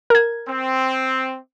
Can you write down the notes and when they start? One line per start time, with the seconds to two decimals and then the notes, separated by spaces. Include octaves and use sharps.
0.10 A#4 G#6
0.47 C4